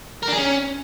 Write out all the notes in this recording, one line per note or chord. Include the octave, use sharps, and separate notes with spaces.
A#4
D4
G#4
C#4